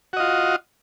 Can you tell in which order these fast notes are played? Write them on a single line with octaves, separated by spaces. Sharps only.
F#4 D#5 F4